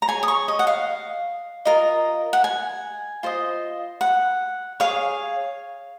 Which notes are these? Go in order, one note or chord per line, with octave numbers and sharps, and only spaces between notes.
A#5
G#4 C#5 G#5
D#6
C#6
D#5
F#5
F5
F4 A#4 D#5
F#5
G#5
F4 C5 D#5
F#5
G#4 C#5 F5